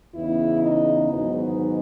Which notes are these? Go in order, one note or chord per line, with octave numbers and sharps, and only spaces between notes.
E2 C#3 E3 B3 D#4 E4
D#4
G#2 D#3 F#3 B3 D#4